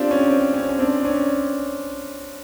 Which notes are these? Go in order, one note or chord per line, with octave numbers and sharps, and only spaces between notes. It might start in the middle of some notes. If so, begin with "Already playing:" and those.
Already playing: C4 D4 F4 G4
C#4
C4
C#4
C#4
C4 D4
D4
C#4